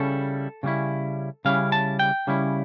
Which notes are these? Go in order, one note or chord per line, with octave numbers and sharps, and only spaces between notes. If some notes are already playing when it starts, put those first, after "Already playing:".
Already playing: C#3 G3 C#4 E4 A4
C#3 G3 C#4 E4
C#3 G3 C#4 E4 F5
A5
G5
C#3 G3 C#4 E4